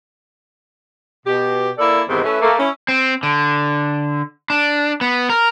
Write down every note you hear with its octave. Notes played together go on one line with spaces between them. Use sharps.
B2 G4
A#3 E4 A4 D5
G#2 C3 D#3 E3 B3 C4
A3 C#4 E4 B4
A3 A#3
C#4 E4
C4
D3
D4
B3
A#4